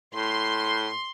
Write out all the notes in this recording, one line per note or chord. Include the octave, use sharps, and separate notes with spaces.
A2 C6